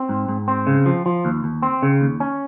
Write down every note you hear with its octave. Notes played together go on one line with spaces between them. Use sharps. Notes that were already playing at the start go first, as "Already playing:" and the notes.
Already playing: C4
G#2
G#2
C4
C#3
F3
F3
D#2
D#2
C4
C#3
D#2
C#4